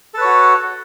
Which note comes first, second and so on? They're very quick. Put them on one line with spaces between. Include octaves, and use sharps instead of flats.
A4 B4 C#5 F#4